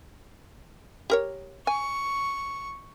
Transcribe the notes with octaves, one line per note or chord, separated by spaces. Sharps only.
G4 A#4 C#5
G#5 C#6